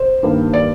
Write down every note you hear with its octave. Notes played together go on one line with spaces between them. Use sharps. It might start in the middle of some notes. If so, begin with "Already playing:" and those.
Already playing: C5
G2 D#3 G3 A#3
D5